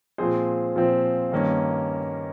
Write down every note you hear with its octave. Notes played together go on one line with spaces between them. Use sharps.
A#2 F3 C4 G#4 C5
A#2 F3 C4
G2 D#3 A#3 C#4